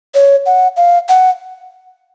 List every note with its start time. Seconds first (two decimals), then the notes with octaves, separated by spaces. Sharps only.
0.14 C#5
0.46 F#5
0.77 F5
1.09 F#5